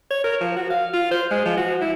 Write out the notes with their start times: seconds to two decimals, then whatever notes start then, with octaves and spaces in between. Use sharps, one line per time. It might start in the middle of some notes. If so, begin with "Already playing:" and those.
0.11 C#5
0.24 A#4
0.41 F3
0.56 F#4
0.70 F5
0.93 F4
1.11 C5
1.31 G#3
1.45 F3
1.57 F#4
1.81 E4